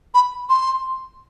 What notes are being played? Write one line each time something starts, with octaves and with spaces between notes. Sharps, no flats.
B5
C6